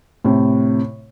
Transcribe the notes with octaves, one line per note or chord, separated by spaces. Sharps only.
A2 C3